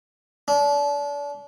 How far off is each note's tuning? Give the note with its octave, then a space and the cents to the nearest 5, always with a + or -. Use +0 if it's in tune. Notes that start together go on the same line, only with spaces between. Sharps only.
D4 -35